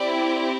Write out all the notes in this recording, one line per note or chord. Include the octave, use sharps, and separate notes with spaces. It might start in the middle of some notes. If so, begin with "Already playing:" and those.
Already playing: C4 E4 G4 D5